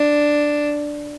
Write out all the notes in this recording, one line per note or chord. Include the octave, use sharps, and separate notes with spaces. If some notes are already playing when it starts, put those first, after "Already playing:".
Already playing: D4